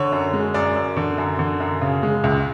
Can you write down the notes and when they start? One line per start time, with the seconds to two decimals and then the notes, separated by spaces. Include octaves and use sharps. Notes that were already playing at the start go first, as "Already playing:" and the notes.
Already playing: D3 C#5
0.12 F#2
0.33 G#3
0.54 F#2 D5
0.76 F#2
0.97 D3
1.18 F#2
1.39 D3
1.60 F#2
1.81 C#3
2.03 G#3
2.24 C#2